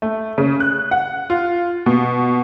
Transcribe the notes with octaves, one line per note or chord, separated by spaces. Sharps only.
A3
C#3
F#6
F#5
F4
B2